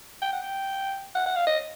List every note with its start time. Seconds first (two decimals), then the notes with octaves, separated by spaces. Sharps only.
0.22 G5
0.32 F#5
0.42 G5
1.15 F#5
1.26 F#5
1.36 F5
1.47 D#5